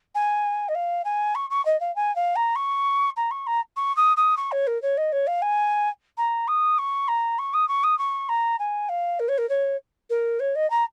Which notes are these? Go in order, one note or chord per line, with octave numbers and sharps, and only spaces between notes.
G#5
D#5
F5
G#5
C#6
C#6
D#5
F5
G#5
F5
A#5
C#6
A#5
C#6
A#5
C#6
D#6
D#6
C#6
C#5
A#4
C#5
D#5
C#5
F5
G#5
A#5
D#6
C#6
A#5
C#6
D#6
C#6
D#6
C#6
A#5
G#5
F5
A#4
C#5
A#4
C#5
A#4
C#5
D#5
A#5